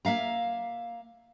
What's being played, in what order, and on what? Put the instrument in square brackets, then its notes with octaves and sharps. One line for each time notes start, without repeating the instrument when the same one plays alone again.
[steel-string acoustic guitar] A#3 E5 F5 A#5